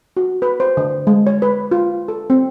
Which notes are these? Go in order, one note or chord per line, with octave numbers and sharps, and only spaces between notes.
F#4
B4
C5
D3
G#3
C#5
B4
F4
A4
C4